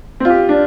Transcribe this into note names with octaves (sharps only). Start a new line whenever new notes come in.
C4
F4
G4
D4